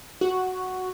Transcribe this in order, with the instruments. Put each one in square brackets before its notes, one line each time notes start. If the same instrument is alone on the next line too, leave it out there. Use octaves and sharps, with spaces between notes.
[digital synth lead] F#4